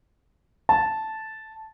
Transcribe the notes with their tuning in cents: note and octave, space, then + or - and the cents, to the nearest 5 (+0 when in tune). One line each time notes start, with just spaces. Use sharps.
A5 -5